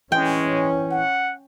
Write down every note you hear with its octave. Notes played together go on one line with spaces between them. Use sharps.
E3 G#3 C#4 G5
F#5